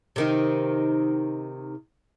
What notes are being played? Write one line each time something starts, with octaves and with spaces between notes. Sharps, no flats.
C3 D#3 D#4